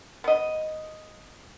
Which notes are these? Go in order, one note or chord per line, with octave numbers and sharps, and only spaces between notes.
B3 D#5